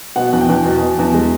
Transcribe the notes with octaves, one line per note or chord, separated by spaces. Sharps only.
B2 F#5
E2
G5
E2
B2
B2
E2
G#3